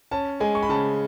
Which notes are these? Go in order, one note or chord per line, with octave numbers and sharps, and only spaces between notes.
C#4 A5
G#3 G#5
C#6
B5
C#3 A5